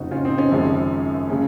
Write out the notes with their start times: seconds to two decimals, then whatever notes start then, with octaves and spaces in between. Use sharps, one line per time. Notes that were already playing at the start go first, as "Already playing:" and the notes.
Already playing: F#1 F2 C#3 D#4 F#4
0.11 C#4 F4
0.25 C4 D#4
0.38 C#4
0.51 G#1 F#2 C#3 F3 G#3
1.29 C#3 F3 G#3 C#4